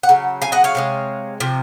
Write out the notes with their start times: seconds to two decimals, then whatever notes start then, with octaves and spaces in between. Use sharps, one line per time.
0.03 F#5
0.09 C#3 F#3
0.42 F5 G#5
0.52 D#5 F#5
0.64 C#5 F5
0.75 C3 F3 G#3
1.40 C3 F3